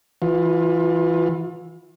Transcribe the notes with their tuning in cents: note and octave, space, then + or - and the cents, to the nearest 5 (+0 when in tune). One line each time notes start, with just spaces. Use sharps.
E3 +0 F4 +35